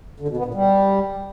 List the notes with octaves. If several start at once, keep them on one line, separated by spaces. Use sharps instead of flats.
D3
B2
B3
A#2
G3